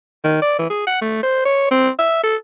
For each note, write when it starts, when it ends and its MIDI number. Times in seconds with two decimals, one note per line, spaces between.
0.24 0.41 51
0.42 0.56 74
0.59 0.66 52
0.70 0.85 68
0.87 0.98 78
1.01 1.22 57
1.23 1.42 72
1.45 1.68 73
1.71 1.89 60
1.99 2.19 76
2.23 2.36 69